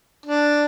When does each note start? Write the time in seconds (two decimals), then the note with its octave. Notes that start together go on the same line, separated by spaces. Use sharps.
0.26 D4